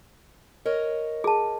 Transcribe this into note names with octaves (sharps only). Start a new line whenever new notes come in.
A#4 C#5 D#5
G#4 A5